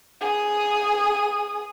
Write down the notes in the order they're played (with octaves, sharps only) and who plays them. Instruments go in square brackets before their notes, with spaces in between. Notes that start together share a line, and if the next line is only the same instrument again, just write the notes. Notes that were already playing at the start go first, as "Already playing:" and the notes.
[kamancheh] G#4 D#6